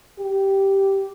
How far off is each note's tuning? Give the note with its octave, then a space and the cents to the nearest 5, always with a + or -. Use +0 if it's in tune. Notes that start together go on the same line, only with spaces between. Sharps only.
G4 -10